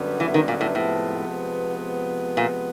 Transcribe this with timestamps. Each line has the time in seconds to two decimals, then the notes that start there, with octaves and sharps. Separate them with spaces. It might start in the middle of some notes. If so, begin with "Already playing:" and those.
Already playing: F#2 D3 G3 B3
0.20 E3
0.34 D#3
0.48 A#2
0.61 A2
0.75 A2 C3 F3 G#3 B3
2.37 A#2